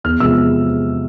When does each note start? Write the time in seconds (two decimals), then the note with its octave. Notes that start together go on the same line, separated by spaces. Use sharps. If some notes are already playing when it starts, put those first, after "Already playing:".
0.04 E2 F6
0.20 C3 F3 G#3 B3 E6